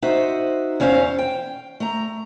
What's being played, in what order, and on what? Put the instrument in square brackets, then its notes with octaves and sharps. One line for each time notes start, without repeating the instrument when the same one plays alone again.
[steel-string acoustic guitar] D#4 F#4 C5 E5
E2 C#4 C5 C#5 F5
G5
A3 A#5